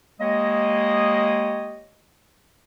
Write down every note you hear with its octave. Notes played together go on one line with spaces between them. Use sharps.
G#3 A#3 G4 C#5 D#5